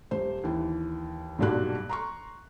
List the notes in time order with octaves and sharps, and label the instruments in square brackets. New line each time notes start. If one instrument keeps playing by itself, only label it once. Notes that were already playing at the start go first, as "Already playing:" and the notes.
[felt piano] D#1 C5
D#2 E3
B1 G2 A#2 G3 F#4 F#6
A#5 C6 C#6